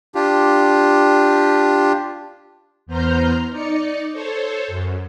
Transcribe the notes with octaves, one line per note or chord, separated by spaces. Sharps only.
D4 F4 G4
E2 B3 C5 A#5 F6 G6
D#4 D5 C#7
A4 C5 C#5
F#2